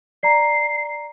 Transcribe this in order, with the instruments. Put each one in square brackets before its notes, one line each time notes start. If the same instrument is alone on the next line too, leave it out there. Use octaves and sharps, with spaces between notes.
[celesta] D5 A#5 [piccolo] C7